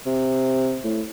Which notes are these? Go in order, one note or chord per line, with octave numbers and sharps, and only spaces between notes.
C3
A2